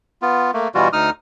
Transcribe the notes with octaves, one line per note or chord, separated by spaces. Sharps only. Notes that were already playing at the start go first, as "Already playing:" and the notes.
B3 F4
A3 A#3
B2 E3 G3 F4 F#4
D2 D#4 D#6 F6